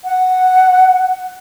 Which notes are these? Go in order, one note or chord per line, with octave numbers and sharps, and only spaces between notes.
F#5